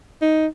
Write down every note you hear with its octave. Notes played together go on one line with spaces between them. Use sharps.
D#4